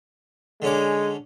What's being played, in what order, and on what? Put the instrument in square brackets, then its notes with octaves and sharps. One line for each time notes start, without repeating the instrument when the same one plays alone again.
[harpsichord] D3 C#4 D6 [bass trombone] G#3